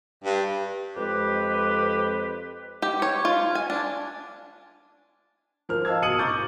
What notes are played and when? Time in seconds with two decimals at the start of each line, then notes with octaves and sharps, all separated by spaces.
0.24 G2
0.96 F2 G#3 G4 B4
2.82 G4
3.02 C#5
3.25 F4
3.55 G#5
3.70 D4
5.69 F3 A#4 C5 F6
5.85 D#5 F5 A5 E6 G#6
6.02 B2 D#6 C#7 D#7 F#7
6.19 A#5 C#6 D6 G6 A6